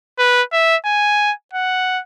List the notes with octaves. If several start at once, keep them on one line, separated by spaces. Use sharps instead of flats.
B4
E5
G#5
F#5